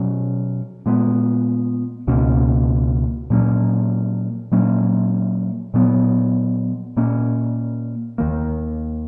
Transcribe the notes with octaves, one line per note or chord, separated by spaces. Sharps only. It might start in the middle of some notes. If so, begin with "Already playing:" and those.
Already playing: B2 F#3 C#4
A#2 G#3 B3
C#2 B2 A#3 C#4
A#2 F#3 A#3 C#4
A#2 F#3 A#3 C#4
A#2 F#3 B3
A#2 A#3 C#4
D#2 D#3 A#3